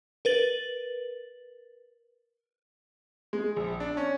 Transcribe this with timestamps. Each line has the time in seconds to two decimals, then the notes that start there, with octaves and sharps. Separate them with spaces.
0.25 A#4 B4 A6 F#7
3.33 G#3
3.56 A#1
3.80 D4
3.97 C#4